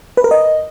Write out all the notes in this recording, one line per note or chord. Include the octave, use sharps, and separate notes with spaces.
B4
A#4
D#5